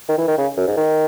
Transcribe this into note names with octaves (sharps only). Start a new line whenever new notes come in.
D#3
E3
D#3
C#3
F#2
G#2
D#3